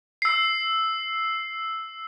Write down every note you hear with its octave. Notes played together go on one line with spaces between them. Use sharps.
E6 C7